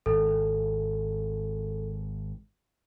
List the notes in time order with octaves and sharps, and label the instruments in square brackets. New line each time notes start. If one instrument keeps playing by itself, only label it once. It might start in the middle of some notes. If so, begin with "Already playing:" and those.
[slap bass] G#1 [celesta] A4